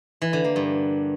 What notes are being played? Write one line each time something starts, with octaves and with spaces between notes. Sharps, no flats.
E3
D3
A#3
G2